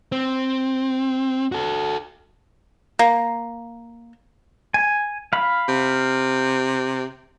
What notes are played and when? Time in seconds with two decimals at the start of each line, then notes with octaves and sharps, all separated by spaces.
0.12 C4
1.52 F#4 A4
2.99 A#3
4.74 G#5
5.33 F5 B5
5.69 C3